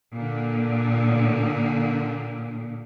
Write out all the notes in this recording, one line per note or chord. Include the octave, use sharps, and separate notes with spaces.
A#2 D3